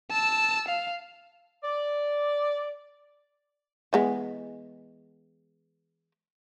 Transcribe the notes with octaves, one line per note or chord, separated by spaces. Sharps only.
A5 E6
F5
D5
E3 G#3 B3